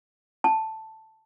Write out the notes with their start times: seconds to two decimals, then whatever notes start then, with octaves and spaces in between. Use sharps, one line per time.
0.44 A5